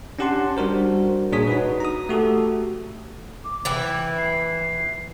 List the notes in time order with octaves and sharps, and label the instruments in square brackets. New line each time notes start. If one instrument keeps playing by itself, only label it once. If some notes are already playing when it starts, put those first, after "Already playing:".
[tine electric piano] C#4 D4 G4 F#5 A5 C6
G3 D4 F#4 A#4 C5
A#2 D4 G#4 C#5 D#6 B6
D#4 F#4 B4
A#5 D#6
A3 F#4 G4 A4
[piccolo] D6
[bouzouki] E3 E4 [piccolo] G5
[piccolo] C7